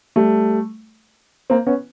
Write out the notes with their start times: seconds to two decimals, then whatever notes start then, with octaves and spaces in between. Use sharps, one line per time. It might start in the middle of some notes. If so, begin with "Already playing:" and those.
0.16 G3 A3
1.50 A#3 C4
1.66 B3 C#4